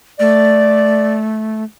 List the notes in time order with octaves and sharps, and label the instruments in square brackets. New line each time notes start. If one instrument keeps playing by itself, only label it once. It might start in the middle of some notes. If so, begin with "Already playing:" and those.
[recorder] A3 [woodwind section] D5